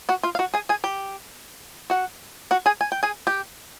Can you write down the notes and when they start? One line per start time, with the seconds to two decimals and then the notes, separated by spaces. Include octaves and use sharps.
0.09 F#4 F#5
0.23 F4 F5
0.35 F5
0.39 F#4 F#5
0.54 G#4 G#5
0.69 G#4 G#5
0.84 G4 G5
1.90 F#4 F#5
2.51 F#4 F#5
2.66 G#4 G#5
2.81 G#5
2.92 G5
3.03 G#4 G#5
3.27 G4 G5